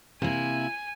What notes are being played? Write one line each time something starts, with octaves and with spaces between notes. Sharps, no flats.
C3 A#3 E4 G#5